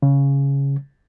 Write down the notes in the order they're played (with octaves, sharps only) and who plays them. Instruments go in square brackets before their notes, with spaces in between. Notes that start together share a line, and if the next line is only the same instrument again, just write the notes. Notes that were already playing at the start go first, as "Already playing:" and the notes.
[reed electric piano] C#3